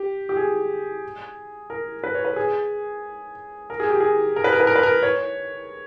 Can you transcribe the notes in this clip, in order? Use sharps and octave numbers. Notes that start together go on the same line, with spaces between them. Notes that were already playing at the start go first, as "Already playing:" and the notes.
Already playing: G4
G4
G#4
A#4
B4
C#5
B4
G#4
A#4
G#4
G4
G#4
A#4
B4
A#4
B4
A#4
B4
A#4
C#5